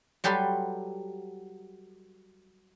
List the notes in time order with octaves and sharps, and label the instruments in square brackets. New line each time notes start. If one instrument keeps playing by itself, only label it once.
[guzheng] F#3 G3 G4 A4 B4 C6